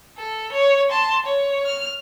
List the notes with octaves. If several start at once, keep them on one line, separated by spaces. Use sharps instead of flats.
A4
C#5
A5 C6
C#5
F6